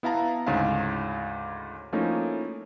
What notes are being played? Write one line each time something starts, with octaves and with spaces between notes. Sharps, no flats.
B3 E4 F5 A5 A#5
D2 G#2 C#3 E4 F5
F3 A3 A#3 C#4 D#4 E4